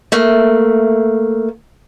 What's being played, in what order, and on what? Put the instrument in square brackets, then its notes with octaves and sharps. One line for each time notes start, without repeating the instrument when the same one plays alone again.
[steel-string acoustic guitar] A3 A#3